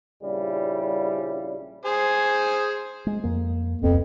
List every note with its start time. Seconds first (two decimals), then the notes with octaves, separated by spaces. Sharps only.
0.21 A#1 C#3 G3 E4
1.85 G#4 C5 G#5
3.07 G#3
3.24 F2 A#3
3.81 D1 C2 F2 B3